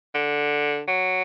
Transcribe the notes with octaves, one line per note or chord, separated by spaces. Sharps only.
D3
F#3